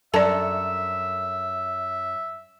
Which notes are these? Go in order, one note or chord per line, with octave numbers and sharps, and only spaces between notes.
F#2 A4 D5 E5 A5